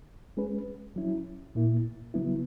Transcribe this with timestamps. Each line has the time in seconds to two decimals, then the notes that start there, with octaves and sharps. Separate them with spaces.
0.37 G#3 C#4 G#4 B4
0.96 F#3 C#4 E4
1.55 A#2 A#3 E4
2.14 C#3 F#3 B3 E4